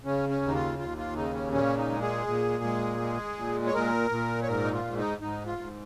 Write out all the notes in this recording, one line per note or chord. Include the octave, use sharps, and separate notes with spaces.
C#3 C#4
C#4
D#2
D#4
F4
D#2 F4
F4
C#3 D#4
C#4
A#2 C#4
D#4
G#3
G#4
A#2
G#3
G#3
A#2
C#5
A#2 A#4
A#2
C#5
G#2 A#4
D#4
F4
G#2
D#4
G#2 D#4
F4
G#2